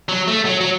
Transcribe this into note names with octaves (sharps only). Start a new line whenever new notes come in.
F#3
A3
F#3
F#3